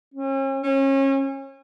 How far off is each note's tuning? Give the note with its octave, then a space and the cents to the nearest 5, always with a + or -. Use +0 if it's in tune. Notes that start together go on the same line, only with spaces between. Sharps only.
C#4 -40
C#4 -30